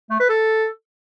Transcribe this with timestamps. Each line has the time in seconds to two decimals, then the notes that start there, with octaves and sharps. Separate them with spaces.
0.10 A3
0.20 B4
0.29 A4